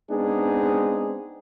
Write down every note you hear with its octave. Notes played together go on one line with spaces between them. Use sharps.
G#3 B3 C4 D4 D#4 G#4